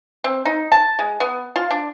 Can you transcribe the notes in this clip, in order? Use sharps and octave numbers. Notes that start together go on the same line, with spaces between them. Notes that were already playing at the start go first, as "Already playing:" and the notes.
C4
D#4
A5
G#3
B3
F4
D4